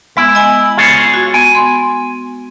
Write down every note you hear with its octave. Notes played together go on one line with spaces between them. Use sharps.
G#3 B3 E4
D#5 G#5
F4 G#4 C#5
F#4
B3 G#5
C6